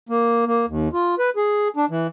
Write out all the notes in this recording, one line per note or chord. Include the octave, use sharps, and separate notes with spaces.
A#3
A#3
D#2
F4
B4
G#4
D4
E3